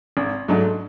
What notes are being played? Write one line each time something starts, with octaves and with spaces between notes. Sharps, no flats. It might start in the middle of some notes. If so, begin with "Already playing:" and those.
G#1
G#2 F#3 A3 D4